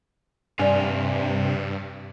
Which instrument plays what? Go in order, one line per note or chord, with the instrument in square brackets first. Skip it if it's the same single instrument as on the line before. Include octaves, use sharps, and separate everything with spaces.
[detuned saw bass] G2 [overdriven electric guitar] C3 F5 [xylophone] D5 G#5